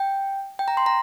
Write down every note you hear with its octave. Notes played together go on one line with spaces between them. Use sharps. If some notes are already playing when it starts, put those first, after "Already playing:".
Already playing: G5
G5
A#5
C6
A#5